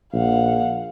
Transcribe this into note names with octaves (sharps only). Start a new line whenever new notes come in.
A#1 F5 F#5